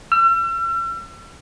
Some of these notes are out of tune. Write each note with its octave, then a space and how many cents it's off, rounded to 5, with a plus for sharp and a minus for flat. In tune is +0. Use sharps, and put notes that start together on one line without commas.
E6 +45